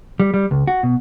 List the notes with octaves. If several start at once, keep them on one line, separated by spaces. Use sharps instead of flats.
G3
G3
C#2
F#4
B2